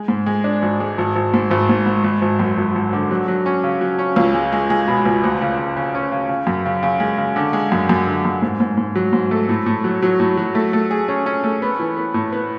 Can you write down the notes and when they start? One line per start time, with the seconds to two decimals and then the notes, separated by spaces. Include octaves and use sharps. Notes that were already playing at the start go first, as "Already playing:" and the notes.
Already playing: G#3
0.08 G#2
0.26 G#3
0.44 D4
0.62 G#1
0.80 G#3
0.98 G#1
1.15 G#1
1.34 G#2
1.51 G#1
1.69 G#2
1.86 G#2
2.04 G#1
2.22 G#1
2.39 F#2
2.58 G#1
2.75 G#1
2.93 D3
3.11 F#3
3.28 F#3
3.46 C#4
3.64 C#3
3.81 F#3
3.99 C#4
4.16 C#2
4.34 G#3
4.52 G#3
4.70 G#3
4.88 B2
5.05 C#2
5.24 D2
5.41 C#3
5.58 C#3
5.77 C#3
5.95 C#4
6.12 C#3
6.29 C#3
6.47 F#2
6.66 C#3
6.83 C#3
7.00 G#3
7.18 C#3
7.36 D3
7.53 G#3
7.72 F#2
7.89 F#2
8.06 D3
8.25 F#2
8.42 G#2
8.60 G#2
8.77 G#2
8.95 F#3
9.13 G#2
9.31 A3
9.49 A2
9.66 A2
9.84 F#3
10.02 F#3
10.20 A2
10.37 F#3
10.55 A3
10.73 A3
10.91 G#4
11.08 C#4
11.26 C#4
11.44 A3
11.62 B3
11.79 E3
11.97 B3
12.14 A2
12.33 B3